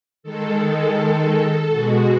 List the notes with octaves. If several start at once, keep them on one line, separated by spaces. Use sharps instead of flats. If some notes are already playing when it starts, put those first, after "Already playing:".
D#3 G#3 A4
A4
B2 G#3 F#4